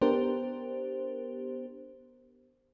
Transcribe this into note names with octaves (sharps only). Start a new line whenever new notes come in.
B3 D4 G4 A#4 C5